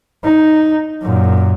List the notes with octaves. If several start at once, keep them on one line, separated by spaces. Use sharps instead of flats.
D#4
F#2 A#2